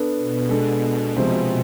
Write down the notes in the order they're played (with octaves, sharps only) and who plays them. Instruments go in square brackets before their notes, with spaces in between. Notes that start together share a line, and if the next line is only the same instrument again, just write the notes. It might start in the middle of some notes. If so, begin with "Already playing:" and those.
Already playing: [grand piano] B3 D4 A4
[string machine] B2
[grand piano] G#3 D4 A4
C3 F3 G#3 C4